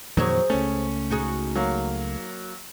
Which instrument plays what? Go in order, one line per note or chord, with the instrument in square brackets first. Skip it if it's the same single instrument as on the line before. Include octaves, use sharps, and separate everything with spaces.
[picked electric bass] F2 A#2 D#3 [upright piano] F#3 [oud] G#4 C5 C#5
[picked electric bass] C#2 A3 [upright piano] C#4
[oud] D#4 F#4 G#4
[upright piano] F#3 A#3